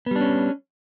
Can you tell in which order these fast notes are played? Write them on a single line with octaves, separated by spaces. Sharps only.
B3 G3 D4 C#4